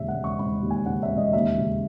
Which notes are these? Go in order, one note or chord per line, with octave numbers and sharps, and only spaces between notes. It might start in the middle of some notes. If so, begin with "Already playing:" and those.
Already playing: E1 D#2 C#3 E5
F#5
E1
C#6
E1 B5
D#2
G#5
C#3 F#5
E5
E1
D#5
D#2 E5
C#3